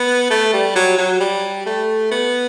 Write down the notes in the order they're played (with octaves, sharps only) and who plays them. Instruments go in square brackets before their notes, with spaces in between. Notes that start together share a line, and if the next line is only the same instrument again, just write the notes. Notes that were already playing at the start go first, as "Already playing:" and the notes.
Already playing: [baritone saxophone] B3
A3
G3
F#3
F#3
G3
A3
B3